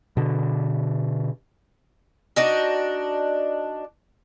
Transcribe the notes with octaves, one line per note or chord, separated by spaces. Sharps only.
B2 D3
D4 D#4 F#4